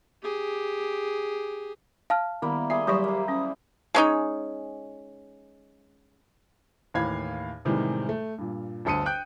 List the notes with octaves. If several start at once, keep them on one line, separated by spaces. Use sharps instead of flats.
G4 G#4
F5 A5 F6
D#3 G3 A#3 B3 E4
G3 G#4 E5 C6
F#3 G3 G4 C5 E5 C#6
A#3 C5
C#4 D#6
G#3 C#4 D#4
D#2 A2 E3 F5 B5 G#6
A2 C3 D#3 E3 G3 G#3
A3
G2 A#2
G1 D2 A4 D#6 C#7 D#7
G5 F#6 G6 D7